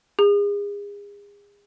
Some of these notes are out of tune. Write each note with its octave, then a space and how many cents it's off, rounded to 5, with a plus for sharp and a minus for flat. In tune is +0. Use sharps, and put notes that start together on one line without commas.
G#4 -35